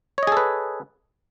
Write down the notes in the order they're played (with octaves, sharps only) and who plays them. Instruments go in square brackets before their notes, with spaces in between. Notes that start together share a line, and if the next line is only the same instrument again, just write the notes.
[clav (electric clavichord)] C#5
D#5
G#4
A4
B4